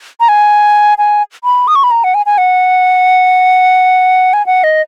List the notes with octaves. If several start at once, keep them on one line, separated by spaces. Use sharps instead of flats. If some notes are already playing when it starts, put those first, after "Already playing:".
A#5
G#5
G#5
B5
D#6
C#6
B5
A#5
F#5
G#5
G#5
F#5
G#5
F#5
D#5